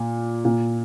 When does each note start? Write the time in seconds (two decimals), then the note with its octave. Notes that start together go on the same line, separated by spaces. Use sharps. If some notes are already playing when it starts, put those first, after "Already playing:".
Already playing: A#2
0.45 A#2